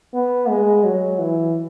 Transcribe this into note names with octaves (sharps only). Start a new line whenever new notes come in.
B3
G#3
F#3
E3